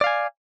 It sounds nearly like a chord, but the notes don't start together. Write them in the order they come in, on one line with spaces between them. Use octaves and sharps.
D5 F5 G#5